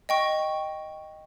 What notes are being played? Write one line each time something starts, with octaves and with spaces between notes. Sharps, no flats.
D#5 G5 C#6